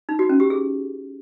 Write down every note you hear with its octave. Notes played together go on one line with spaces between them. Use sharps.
D#4
F#4
C#4
G4
G#4